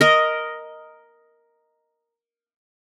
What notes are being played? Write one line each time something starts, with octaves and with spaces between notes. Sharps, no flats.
A#4 D#5